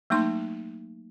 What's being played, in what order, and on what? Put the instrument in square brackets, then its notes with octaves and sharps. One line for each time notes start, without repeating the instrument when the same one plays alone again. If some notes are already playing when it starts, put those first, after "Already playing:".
[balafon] F#3 A3 A#3 D#4 C6